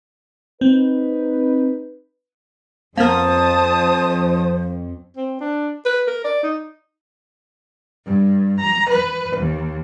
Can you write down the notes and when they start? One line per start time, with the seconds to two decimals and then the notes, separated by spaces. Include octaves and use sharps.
0.61 C4 D#4 B4
2.98 F2 A#3 B3 A#4 C5 A5 D#6
5.17 C4
5.40 D4
5.85 B4
6.07 A#4
6.24 D5
6.43 D#4
8.05 G2
8.60 A#5
8.90 B4
9.37 D#2